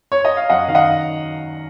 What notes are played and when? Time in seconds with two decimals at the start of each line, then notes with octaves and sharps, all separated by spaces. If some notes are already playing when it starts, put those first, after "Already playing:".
0.12 C#5
0.25 D#5
0.37 F5
0.50 F#2 D#5 F#5
0.68 D#3 F5
0.75 D#5 F#5